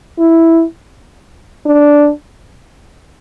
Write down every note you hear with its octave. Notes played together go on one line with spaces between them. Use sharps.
E4
D4